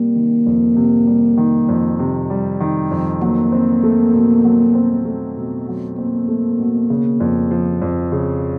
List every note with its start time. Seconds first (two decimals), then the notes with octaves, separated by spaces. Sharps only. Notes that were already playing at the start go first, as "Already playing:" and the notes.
Already playing: C3 G3 A#3
0.15 D#3
0.46 F2
0.77 C3
1.07 G3
1.37 D#3
1.69 F2
1.99 C3
2.30 G3
2.60 D#3
2.91 F2
3.21 F#3 A#3
3.52 C4
3.83 A3
4.14 B2
4.44 F#3
4.75 C4
5.05 A3
5.36 B2
5.68 F#3
5.97 A#3 C4
6.28 A3
6.59 B2
6.90 C#3
7.20 F2
7.51 F3
7.81 F2
8.12 C#3